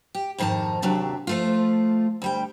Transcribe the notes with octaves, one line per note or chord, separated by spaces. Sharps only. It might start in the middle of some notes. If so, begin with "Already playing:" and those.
G4
F2 G#2 D#3 D#4 A5
D#2 C3 F#3 D4 E5
F3 A3 F4
D2 G3 G5